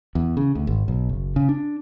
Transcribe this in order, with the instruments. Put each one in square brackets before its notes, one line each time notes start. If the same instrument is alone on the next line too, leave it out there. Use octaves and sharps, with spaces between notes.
[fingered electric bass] E2
C#3
D2
G#1
B1
F#1
C#3
D4